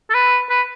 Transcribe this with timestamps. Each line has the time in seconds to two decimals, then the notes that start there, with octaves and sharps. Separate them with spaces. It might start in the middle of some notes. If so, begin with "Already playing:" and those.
0.10 A4
0.14 B4
0.49 B4